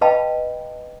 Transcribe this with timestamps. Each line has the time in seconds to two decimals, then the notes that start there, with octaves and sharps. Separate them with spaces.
0.01 B4 D#5 F5 G5 A5 B5